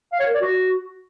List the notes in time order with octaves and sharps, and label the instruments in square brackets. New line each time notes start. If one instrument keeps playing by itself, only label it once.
[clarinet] F5
C#5
A#4
D5
F#4